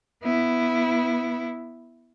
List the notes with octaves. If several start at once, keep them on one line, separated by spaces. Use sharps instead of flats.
B3 E4